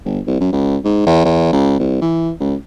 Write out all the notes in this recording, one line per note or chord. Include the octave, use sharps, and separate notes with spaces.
G1
C2
F#2
C#2
G#2
E2
E2
C#2
C2
E3
C#2